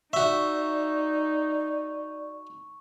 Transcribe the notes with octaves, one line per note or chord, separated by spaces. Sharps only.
D#4 F#4 D5 E5 C#6